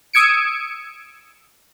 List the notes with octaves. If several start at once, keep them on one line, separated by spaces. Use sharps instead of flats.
D#6 E6 G#6 C#7 D7